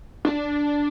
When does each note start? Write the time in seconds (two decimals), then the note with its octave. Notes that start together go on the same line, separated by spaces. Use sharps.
0.25 D4